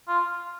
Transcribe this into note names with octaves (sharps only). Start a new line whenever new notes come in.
F4